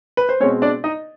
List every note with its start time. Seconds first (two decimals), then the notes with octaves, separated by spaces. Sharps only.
0.17 B4
0.29 C5
0.40 B2 G#3 C4 C#4 C#5
0.62 D4 D5
0.84 D#4 D#5